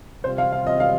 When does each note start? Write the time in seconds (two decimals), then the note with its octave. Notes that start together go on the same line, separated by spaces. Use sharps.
0.24 C3 G3 C4 F4 C5
0.38 F5
0.52 F5
0.67 D#5
0.80 F5